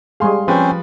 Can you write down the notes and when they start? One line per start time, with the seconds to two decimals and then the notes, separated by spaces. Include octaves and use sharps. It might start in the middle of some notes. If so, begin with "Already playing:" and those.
0.20 G3 G#3 G#4 F5 C6
0.48 F3 C4 C#4 B4 C5